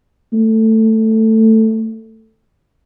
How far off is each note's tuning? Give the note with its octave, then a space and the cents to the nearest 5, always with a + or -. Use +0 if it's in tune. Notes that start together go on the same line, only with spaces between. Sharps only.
A3 +10